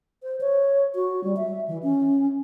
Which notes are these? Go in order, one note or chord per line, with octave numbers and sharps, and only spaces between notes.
C5
C#5
F#4
G3
E5
E3
C#4